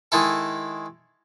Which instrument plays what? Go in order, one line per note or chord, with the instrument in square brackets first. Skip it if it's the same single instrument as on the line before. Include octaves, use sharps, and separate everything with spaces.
[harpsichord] D#3 G#3 E4 A4